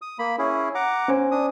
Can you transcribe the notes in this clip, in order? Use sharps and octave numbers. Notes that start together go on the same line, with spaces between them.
D#6
A#3 B5
C#4 E4 G#4
F#5 A#5 D6
C#4 C5 G#5
D4 D#6